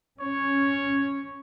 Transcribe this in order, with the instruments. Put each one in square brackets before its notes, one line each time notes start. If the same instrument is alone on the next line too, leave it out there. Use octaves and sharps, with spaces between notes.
[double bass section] C#4 [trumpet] C#5